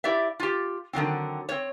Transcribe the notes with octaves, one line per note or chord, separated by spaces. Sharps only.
E4 G4 D5 E5
F4 G4
D3 D#3 F#3 C4
C4 C#5